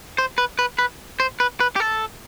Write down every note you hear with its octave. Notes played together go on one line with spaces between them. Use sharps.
C5
B4
B4
B4
C5
B4
B4
G4
A4